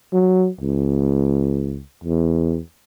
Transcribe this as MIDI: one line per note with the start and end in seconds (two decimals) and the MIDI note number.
0.13 0.49 54
0.61 1.82 37
2.04 2.59 40